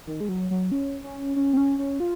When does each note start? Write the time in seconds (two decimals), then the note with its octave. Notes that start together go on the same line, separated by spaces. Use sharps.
0.07 D#3
0.21 G#3
0.29 F#3
0.51 F#3
0.72 C#4
1.04 C#4
1.36 C#4
1.53 C4
1.57 C#4
1.79 C#4
2.00 F4